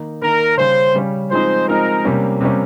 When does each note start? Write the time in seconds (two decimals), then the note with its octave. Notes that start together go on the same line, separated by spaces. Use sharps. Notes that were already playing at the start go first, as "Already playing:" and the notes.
Already playing: D#3 A#3 D#4
0.22 D#3 A#3 D#4 A#4
0.58 C#3 G3 C#4 C5
0.94 C#3 G3 C#4
1.31 F3 G#3 C4 D#4 C5
1.67 F3 G#3 C4 D#4 A#4
2.05 C3 G3 A#3 C#4
2.41 C3 G3 A#3 C#4